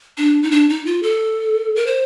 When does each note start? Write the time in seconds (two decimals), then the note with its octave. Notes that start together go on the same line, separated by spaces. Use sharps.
0.18 D4
0.43 D#4
0.51 D4
0.69 D#4
0.86 F4
1.03 A4
1.76 A#4
1.87 C5